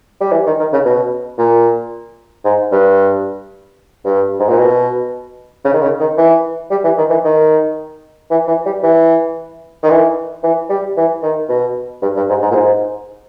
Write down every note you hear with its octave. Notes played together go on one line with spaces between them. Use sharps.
G3
E3
D#3
D#3
C#3
B2
A#2
G#2
G2
G2
G#2
A#2
B2
C#3
D#3
C#3
D#3
E3
G3
E3
D#3
E3
D#3
E3
E3
G3
E3
D#3
E3
E3
G3
E3
D#3
B2
G2
G2
G#2
G#2
A#2
G#2